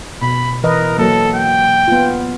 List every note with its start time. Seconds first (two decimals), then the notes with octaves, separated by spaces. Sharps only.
0.22 B2 B5
0.64 E3 A#4 B4 D#5
0.98 F#3 A#3 A4
1.35 G5
1.88 B3 F4